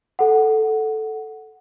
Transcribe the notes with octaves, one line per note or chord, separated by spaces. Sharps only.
A4 F#5